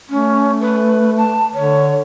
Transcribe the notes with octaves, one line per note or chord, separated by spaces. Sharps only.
A3 C#4
B4
A5
D3 C#5